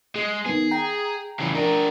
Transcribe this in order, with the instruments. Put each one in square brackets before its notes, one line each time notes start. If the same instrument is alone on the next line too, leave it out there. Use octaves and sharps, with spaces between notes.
[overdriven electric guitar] G#3
[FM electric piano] D#3 B3 [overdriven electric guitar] G#4
[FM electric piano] G5 A#5
[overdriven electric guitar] C#3 E3
D4 A#4